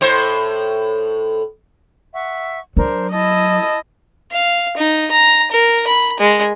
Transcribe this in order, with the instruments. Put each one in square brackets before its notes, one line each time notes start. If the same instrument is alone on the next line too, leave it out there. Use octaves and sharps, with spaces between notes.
[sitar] A2 C5
[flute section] E5 F#5 C#6
[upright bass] F#3 [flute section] D4 A#4 C5
[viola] E4 D#5 [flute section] A5
[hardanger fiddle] F5
D#4
A#5
A#4
B5
G#3